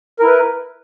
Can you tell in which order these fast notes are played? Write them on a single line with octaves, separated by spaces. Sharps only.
A#4 E4 B4